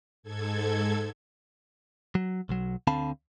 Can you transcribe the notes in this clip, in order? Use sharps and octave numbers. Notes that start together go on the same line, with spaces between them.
G#2 A4 G#6
F#3
B1 F#3
D2 D3 C4 F5 A5 B5